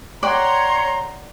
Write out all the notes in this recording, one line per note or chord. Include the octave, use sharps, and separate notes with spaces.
C#5 D5 F#5 G5 A#5 C6